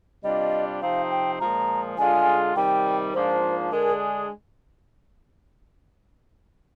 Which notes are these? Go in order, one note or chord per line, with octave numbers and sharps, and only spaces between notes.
C3 G3 D4 F4 D#5
C3 F3 C4 D#4 F5
G5
A#2 F3 G#3 A#5
D3 G#3 D4 F4 G#4 G#5
C3 D#3 G3 G5
G#2 F3 A#3 D4 F4 C5
D3 G#3 D4 G#4 A#4